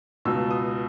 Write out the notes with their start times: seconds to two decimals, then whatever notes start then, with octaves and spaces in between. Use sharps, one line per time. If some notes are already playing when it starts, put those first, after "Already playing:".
0.25 C#2 B2 E6
0.51 D#6